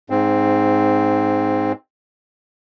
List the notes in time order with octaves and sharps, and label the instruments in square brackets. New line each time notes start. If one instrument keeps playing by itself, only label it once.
[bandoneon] G#2 C4